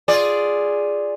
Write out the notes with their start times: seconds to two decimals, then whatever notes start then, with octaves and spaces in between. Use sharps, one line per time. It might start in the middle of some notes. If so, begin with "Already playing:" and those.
0.08 F4 G#4 D5